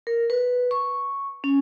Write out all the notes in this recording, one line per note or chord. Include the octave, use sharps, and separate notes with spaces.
A#4
B4
C#6
C#4